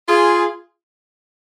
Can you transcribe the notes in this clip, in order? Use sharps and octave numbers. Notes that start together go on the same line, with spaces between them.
F4 G#4